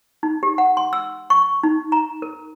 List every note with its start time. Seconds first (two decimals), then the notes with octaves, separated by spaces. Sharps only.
0.23 D#4
0.43 G4
0.58 F#5
0.77 C6
0.93 E6
1.30 C#6
1.63 D#4
1.92 A#5
2.22 A#4